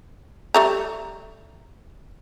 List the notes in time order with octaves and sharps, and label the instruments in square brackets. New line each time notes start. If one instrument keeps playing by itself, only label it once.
[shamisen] G3 A3 A#5